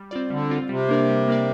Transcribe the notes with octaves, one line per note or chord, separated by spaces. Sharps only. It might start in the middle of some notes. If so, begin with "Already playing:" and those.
Already playing: G3
C4 F4 D5
D3 G3
C4 F4 D5
C3 G3
A#3 D4 A#4 D5
G3
A#3 D4 A#4 D5